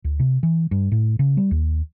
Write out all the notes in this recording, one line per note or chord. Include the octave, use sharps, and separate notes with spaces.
D2
C3
E3
G2
A2
C#3
G3
D#2